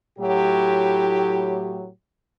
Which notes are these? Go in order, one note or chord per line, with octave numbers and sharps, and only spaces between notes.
A2 F#3 G4